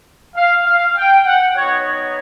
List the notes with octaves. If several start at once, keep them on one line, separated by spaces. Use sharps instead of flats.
F5
F5
G5
F#5
B3 D#4 F#4 C#5
C#5